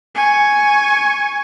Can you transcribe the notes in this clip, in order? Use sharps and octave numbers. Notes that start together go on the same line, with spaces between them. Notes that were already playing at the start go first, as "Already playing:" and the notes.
G#5 C#6